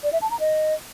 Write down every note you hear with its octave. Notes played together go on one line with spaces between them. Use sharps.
D5
E5
A5
A#5
D#5